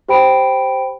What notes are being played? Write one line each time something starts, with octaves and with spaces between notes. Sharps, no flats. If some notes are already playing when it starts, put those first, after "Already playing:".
G4 C5 G5 B5 D7